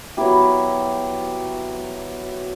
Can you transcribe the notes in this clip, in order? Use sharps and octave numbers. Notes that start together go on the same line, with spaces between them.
F#3 B3 E4 G4